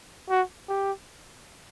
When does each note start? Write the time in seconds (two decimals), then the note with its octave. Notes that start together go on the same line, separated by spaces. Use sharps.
0.30 F#4
0.68 G4